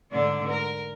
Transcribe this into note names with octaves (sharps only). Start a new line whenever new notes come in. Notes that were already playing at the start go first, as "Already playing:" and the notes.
G#2 D3 D4
A#4